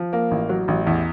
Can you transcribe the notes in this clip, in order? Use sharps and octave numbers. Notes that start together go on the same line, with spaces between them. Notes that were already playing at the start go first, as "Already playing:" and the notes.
Already playing: F3
A#3
A1
F#3
A1
E2